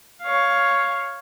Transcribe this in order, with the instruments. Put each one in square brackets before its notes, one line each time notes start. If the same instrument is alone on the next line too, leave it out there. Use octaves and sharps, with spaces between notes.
[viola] C#5 F5